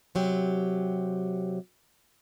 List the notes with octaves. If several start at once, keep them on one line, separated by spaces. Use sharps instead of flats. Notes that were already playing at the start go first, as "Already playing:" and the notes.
C3 F#3 G4